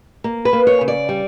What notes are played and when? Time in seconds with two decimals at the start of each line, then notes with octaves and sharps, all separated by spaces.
0.24 A#3
0.45 B4
0.53 A#3
0.67 C#5
0.81 C#3
0.88 D5
1.09 G3